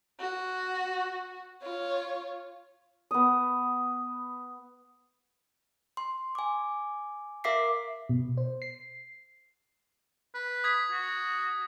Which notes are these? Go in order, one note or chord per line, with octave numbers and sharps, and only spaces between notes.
F#4
F4 C#5
B3 D#6
C6
G#5 D6
A#4 E5 F5 D6 B6 C7
B2
C5
C7
B4
D#6 G#6 B6
F#4